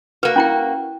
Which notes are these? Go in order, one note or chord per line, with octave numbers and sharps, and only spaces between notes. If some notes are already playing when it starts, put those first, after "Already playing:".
A#3 F#4 B4
C#4 E4 G5